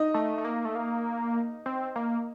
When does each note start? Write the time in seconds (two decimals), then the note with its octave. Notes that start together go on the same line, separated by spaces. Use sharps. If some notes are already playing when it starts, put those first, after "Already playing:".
Already playing: D#4 D#5
0.14 A3
0.38 A3
0.45 A#3
0.65 A3
0.75 A#3
1.66 C4
1.96 A#3